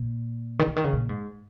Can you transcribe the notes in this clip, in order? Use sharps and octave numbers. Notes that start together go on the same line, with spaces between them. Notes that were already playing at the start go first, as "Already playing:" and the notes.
Already playing: A#2
D#3
C#3
D#3
C#3
A#2
G#2